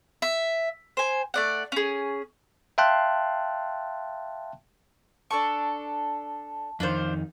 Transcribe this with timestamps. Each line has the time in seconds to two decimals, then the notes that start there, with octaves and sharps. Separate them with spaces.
0.22 E5
0.97 C5 G#5
1.34 A3 D5 F#5
1.72 C#4 G#4
2.78 E5 F5 G5 A5 C6 F#6
5.31 D4 A4 A5 C#6
6.80 F2 D#3 D4 F4 C5